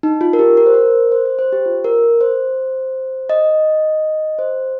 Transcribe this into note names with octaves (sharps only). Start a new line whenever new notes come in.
D#4
F4
A#4
G4
A#4
C5
A#4
C5
C5
C5
G4
F4
A#4
C5
D#5
C5